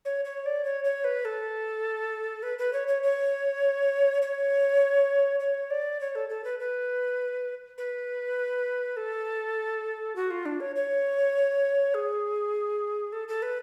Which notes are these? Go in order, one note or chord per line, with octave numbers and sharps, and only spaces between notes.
C#5
C#5
D5
C#5
C#5
B4
A4
B4
B4
C#5
C#5
C#5
C#5
C#5
D5
C#5
A4
A4
B4
B4
B4
A4
F#4
F4
D4
C#5
C#5
G#4
A4
A4
B4